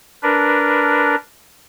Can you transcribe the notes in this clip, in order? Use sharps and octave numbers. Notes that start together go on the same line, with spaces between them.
D4 A#4 B4